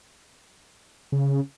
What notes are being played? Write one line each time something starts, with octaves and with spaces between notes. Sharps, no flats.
C#3